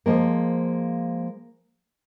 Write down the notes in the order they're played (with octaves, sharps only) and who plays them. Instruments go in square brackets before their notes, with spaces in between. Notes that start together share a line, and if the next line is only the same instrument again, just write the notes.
[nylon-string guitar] F3 G#3 A#3